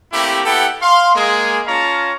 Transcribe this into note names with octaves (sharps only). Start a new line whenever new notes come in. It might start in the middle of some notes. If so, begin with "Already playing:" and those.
A3 A#3 C4 E4 G4
B3 E4 G4 A4 F#5 G5
F5 C6
G#3 A#3 G#4
C#4 F4 C#5 F5 A5 A#5